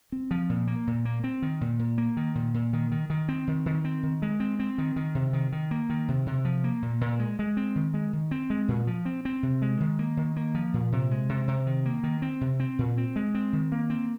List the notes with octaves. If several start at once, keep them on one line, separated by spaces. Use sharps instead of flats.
C4
F3
A#2
A#3
A#2
A#3
C4
D#3
A#2
A#2
A#3
D#3
A#2
A#2
D#3
D#3
D#3
C4
D#3
D#3
C4
D#3
G#3
C4
C4
D#3
D#3
C3
D#3
D#3
A#3
D#3
C3
C3
F3
A#3
A#2
A#2
G#3
G#3
C4
D#3
G#3
D#3
C4
G#3
A#2
F3
C4
C4
C3
G#3
D#3
A#3
D#3
A#3
F3
A#2
C3
G#3
C3
C3
D#3
A#3
D#3
C4
C3
C4
A#2
C4
G#3
C4
D#3
A#3
C4